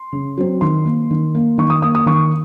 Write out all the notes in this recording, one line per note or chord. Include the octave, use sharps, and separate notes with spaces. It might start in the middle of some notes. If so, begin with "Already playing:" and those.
Already playing: C6
C#3
F#3 C4
D#3 C6
A#3
D#3
A#3
D#3 C#6
D#6
A#3 D#6
D#6
D#3 C#6